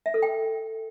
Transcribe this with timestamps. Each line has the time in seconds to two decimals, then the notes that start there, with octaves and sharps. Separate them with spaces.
0.06 E5
0.14 A4
0.22 G5